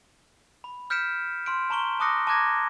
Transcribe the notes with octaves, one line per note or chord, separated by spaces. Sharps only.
B5
F6 G6 B6 C#7 D7 E7
C6 F6 D7
A5 A#5 C6 C#6 D7 G7
A5 D6 D#6 F#6 A#6 C#7
A5 A#5 D6 F#6 G#6 A#6